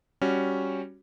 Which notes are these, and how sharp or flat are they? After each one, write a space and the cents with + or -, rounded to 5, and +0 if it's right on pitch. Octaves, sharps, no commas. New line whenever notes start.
G3 +0 C#4 +0 F#4 +0